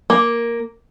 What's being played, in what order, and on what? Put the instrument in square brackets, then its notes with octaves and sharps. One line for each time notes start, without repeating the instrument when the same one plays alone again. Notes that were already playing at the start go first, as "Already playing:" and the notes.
[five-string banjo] A#3